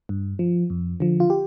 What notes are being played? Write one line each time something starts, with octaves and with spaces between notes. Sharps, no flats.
G2
F3
F2
D3 F3
F4
G4